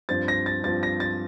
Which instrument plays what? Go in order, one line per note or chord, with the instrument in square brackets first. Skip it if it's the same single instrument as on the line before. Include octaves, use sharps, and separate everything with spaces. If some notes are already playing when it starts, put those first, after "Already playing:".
[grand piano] G2 F3 C4 A6
A#6
A6
G2 F3 C4 A6
A#6
A6